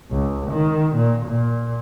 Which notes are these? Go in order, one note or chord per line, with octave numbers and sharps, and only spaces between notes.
C#2
D#3
A#2
A#2